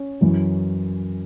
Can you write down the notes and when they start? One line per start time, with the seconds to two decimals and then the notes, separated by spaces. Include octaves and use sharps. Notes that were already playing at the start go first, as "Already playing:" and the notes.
Already playing: C#4
0.21 F#2 E3